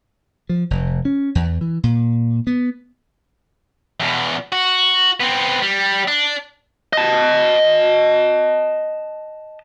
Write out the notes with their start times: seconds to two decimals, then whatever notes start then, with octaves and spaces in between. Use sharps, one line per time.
0.49 F3
0.71 F1
1.05 C#4
1.35 E2
1.61 E3
1.84 A#2
2.47 B3
4.00 E2 B2
4.52 F#4
5.21 B3 C4
5.63 G3
6.08 D4
6.93 D#5 A5